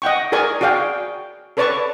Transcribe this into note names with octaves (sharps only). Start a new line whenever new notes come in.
D#5 F#5 G5 C#6
G#4 A#4 D5 G#5 C#6
F#4 G#4 D5 F5 G5
A4 B4 C#5 D5 A5 C#6